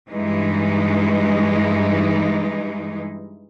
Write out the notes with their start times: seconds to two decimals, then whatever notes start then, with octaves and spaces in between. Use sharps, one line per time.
0.11 G2 E3 G#3 D#4